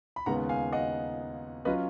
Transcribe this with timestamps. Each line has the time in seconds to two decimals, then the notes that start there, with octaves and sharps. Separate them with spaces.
0.16 B5
0.26 D#2 C#3 G#3 B3 F#5 A#5
0.49 F5 G#5
0.72 D#5 F#5
1.65 F#3 C#4 F4 B4 D#5